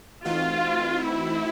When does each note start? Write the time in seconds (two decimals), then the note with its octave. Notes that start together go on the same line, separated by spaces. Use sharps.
0.25 E3 A3 C4 D#4 F4 F#4
1.04 E4